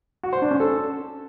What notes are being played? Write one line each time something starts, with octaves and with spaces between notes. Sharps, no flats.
F#4
C5
D4
C#4
A4